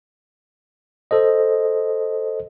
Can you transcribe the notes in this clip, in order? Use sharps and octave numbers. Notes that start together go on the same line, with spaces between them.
A4 C5 D#5